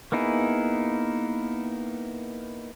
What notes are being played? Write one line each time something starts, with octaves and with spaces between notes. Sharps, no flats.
A#3 B3 D#4 E4 G#4